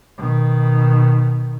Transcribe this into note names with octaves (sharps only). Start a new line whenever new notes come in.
B2 D#3